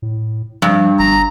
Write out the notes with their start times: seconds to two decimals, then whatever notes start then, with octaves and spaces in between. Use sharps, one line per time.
0.02 A2
0.62 G2 F3
0.99 G1 A#5